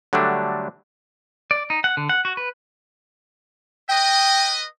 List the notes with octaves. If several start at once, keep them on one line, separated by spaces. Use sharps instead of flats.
D3 F#3 G3 A3 D4
D5
D#4
F#5
D3
F#5
F#4
B4
B4 D#5 G5